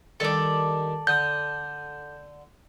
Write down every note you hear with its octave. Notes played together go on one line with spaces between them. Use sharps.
D#3 G3 D4 A4 D5
D3 D#6 G6